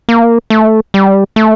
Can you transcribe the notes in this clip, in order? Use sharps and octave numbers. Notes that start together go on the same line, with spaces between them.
A#3
A3
G3
A3